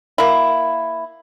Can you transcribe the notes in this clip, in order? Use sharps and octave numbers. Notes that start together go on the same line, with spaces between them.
A#3 E4